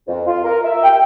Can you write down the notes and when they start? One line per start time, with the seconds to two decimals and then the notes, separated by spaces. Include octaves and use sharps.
0.08 F2
0.27 F4
0.44 A#4
0.64 E5
0.83 G5